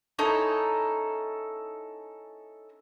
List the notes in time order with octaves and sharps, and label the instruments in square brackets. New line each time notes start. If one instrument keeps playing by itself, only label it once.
[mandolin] C#4 D#4 E4 A4